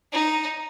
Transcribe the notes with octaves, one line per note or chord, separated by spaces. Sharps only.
D#4